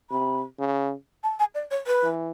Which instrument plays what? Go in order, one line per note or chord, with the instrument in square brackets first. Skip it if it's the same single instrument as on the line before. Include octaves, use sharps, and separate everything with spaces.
[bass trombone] C3 [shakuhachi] B5
[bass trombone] C#3
[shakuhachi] A5
G#5
D5
C#5
B4
[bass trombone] E3